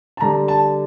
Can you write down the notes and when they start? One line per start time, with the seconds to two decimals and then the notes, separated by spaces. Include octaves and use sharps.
0.17 A5
0.20 D3 G3 A#5
0.48 A5